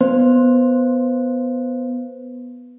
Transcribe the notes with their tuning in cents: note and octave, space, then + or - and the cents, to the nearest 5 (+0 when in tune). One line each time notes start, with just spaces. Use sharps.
B3 +0 C5 +0